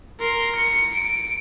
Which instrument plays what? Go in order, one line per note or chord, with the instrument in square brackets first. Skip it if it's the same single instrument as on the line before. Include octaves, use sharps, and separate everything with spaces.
[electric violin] A#4 C6
C#7
D7